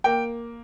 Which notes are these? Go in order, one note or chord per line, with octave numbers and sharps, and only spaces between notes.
A#3 G5